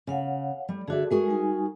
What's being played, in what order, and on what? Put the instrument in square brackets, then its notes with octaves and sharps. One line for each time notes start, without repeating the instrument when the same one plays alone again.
[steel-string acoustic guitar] C#3 [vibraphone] C#5 F5 F#5
[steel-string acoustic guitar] G3
[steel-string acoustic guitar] D3 D5 E5 [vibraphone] F#4 G#4
[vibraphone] G#3 G#5 [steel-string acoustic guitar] F#4 G#4 A#4
[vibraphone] G3 D#4 G#5